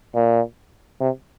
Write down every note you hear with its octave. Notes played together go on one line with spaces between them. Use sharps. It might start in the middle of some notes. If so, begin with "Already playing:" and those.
A#2
C3